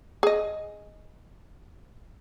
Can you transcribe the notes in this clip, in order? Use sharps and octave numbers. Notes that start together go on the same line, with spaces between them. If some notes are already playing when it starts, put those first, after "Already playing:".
G#4 D#5